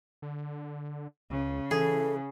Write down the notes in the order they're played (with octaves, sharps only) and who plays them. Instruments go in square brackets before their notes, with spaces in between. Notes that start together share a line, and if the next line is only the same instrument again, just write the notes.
[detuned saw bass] D3
[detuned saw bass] C#2 [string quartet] C#3
[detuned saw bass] E3 [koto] G#4 [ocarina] A4